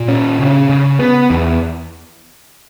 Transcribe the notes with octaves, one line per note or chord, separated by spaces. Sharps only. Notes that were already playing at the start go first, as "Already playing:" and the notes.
Already playing: A#2
C#4
C#3
C#3
B3
E2